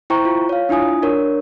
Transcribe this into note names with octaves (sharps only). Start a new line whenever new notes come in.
E4 C5 G5 A#5 C#6
F4
C#5 F5
D4 E4 F4 G#5 D#6
D4 A#4 C#5